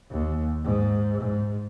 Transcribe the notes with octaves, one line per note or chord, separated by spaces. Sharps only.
D#2
G#2
G#2